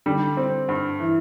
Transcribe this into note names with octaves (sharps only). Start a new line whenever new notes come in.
D3 G3
C4
G2
E3